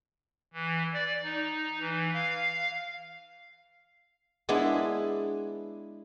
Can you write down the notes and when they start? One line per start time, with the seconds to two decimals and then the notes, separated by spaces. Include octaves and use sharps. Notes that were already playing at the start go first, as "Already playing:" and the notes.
0.53 E3
0.93 D5
1.23 D#4
1.80 E3
2.14 F5
4.49 G#3 B3 D4 E4 G#4